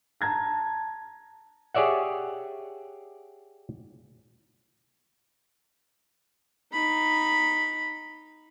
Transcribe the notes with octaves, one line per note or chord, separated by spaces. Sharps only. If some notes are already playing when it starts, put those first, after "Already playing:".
A5 A#5 G#6 A#6
G4 G#4 C#5 D5 E5 F#5
D#4 B5